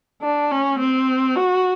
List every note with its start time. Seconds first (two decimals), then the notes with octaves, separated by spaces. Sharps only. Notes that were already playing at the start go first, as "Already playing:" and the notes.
0.22 D4
0.51 C#4
0.79 C4
1.36 F#4